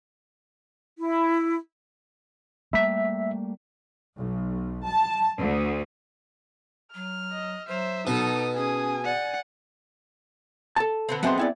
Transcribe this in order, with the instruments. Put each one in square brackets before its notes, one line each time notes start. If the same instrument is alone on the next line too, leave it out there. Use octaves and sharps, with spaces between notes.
[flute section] E4
[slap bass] G3 A3 A#3 [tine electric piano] E5 B6
[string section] B1
A5
D2
[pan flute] F#3 [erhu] F6
[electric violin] D#5
[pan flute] F#3 [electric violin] C5 E5
[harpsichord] B2 [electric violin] D#4 A4 [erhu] D#6
[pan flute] C#4 [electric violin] G#4 D#6 [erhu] G#5
[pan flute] D5 [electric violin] F#5
[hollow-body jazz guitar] A4 A5
[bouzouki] D3 B3 C4
[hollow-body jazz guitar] F#3 C4 C6 [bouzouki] G#3 A3 B3
[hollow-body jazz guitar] C4 E4 D5